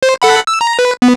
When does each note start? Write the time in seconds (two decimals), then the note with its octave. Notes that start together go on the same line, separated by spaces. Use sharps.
0.03 C5
0.22 A4 F#5 B5
0.47 E6
0.61 A#5
0.79 B4
1.02 B3